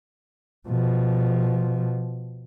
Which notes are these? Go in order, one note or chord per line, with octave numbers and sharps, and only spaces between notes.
B2 F3